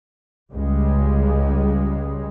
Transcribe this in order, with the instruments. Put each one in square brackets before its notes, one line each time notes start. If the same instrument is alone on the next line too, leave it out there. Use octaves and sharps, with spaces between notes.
[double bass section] C#2 C#3 G3 G#3